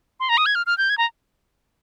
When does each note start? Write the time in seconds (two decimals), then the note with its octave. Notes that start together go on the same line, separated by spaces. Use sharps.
0.20 C6
0.29 A#5
0.38 D#6
0.46 G#6
0.55 F6
0.66 F6
0.78 G6
0.90 G#6
0.98 A#5